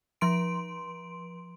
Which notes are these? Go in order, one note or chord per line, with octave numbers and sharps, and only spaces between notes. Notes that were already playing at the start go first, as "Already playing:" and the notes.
F3 C6 D7